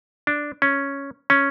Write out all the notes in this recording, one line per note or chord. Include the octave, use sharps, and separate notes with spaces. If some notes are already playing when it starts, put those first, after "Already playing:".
D4
C#4
C#4